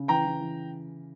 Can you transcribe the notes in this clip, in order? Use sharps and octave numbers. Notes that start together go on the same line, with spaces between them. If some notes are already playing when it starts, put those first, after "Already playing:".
Already playing: C#3
E3 G5 A#5
E3
E3